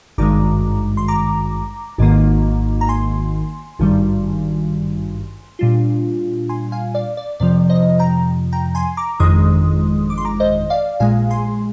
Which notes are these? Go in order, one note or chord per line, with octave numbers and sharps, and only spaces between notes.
G#1 G2 D#3 G#3 A#5 D6
C6
A#5 D6
G#1 G#2 D#3 A#3
A#5
G#5 C6
G#1 G2 D#3 G3
A#2 G3 D4 F4
G#5 C6
F5 G#5
D5 F5
D5
F2 C3 F3 D5
C5 D#5
G5 A#5
G5 A#5
G#5 C6
A#5 D6
G1 F2 D#3 G#3 C6 D#6
D6
C6
A#5 D6
C5 D#5
D5 F5
A#1 A#2 G#3 F5 G#5
G#5 C6